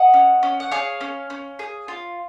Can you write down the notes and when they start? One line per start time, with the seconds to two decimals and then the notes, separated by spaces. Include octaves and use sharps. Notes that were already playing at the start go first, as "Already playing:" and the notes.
Already playing: D#5 F#5
0.14 C#4
0.43 C#4
0.60 F#5
0.71 G#4 C#5 F5
1.01 C#4
1.30 C#4
1.59 G#4
1.88 F4